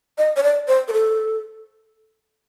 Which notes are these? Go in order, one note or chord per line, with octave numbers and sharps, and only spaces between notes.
D#5
C#5
D5
C5
A#4
A4